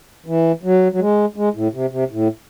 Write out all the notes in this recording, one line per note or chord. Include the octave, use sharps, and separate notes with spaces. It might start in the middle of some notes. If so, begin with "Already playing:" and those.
E3
F#3
F#3
G#3
G#3
A2
C3
C3
A2